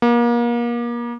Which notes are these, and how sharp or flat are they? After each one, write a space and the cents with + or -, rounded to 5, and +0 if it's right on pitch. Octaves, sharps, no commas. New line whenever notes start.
A#3 +35